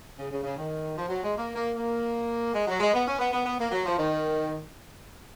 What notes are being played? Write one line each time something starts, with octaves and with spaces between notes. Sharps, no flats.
C#3
C#3
C#3
D#3
F3
F#3
G#3
A#3
A#3
A#3
G#3
F#3
G#3
B3
C#4
B3
B3
B3
A#3
F#3
F3
D#3